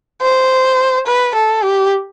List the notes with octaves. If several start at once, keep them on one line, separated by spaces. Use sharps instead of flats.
C5
B4
A4
G4